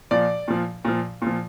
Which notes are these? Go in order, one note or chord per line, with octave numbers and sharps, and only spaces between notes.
A#2 F3 D5
A#2 F3
A#2 F3
A#2 F3